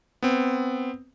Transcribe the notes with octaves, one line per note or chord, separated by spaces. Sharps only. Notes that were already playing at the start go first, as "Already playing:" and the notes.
B3 C4